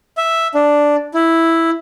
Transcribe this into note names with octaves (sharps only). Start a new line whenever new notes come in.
E5
D4
E4